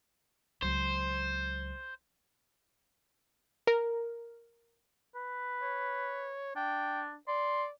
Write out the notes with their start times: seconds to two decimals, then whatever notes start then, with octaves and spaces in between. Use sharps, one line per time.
0.62 C#2 F#3 C5
3.67 A#4
5.15 B4
5.62 C#5
6.56 D4 G5
7.28 D5 C6